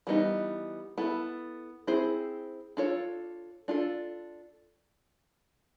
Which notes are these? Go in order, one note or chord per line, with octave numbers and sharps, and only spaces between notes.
E3 G3 B3 D#4
B3 E4 A4
C4 E4 G#4 C5
D4 F4 A4 C#5
D4 F4 A4